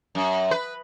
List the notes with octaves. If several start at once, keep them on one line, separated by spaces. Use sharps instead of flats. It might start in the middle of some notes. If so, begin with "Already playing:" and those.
F#2
B4